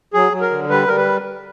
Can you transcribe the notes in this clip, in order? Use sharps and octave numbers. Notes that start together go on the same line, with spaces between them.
F#3 G#4
F#3
A#4
D3
G3 B4
G3 A#4
B4